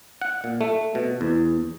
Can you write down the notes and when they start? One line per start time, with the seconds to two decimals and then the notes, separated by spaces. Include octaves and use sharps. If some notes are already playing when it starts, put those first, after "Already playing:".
0.22 F#5
0.44 A#2
0.61 A3
0.95 B2
1.21 E2